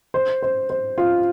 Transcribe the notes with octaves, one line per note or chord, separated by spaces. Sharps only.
C5
C5
C5
F4